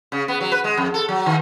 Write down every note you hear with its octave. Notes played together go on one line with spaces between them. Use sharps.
C#3
B3
F#3
B4
G#3
F2
A4
F#3
D#3